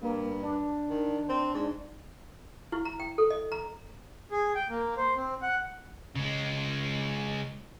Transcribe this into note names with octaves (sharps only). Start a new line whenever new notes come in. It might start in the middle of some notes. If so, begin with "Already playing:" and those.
G2 A#3
D4
D#3
C4
G#2
E4
A#5
G5
A4
D#5
A#5
G#4
G5
A#3
C5
C4
F#5
C#3 G#3